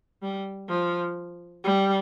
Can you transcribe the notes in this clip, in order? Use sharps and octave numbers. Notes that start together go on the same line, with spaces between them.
G3
F3
G3